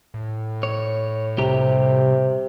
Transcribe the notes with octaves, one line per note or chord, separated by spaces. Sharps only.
A2
C#5
C2 C3 G4 A#5